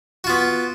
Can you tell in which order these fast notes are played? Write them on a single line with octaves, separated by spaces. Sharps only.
F#4 F4 B3